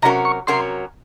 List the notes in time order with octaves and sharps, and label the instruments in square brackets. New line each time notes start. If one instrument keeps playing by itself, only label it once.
[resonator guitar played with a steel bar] C3 F#3 C#4 F#4 A#4 [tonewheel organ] A#5
[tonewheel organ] C#6
[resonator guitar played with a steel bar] C3 F#3 C#4 F#4 A#4 [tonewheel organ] C6